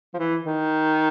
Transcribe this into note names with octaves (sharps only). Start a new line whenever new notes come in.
F3
E3
D#3